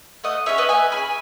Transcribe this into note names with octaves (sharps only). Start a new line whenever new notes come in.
A3 D#5 F#5
C#4 G#4 C#5 E5
B4 D#5
A3 E5 G#5
C#4 G#4 G#5 B5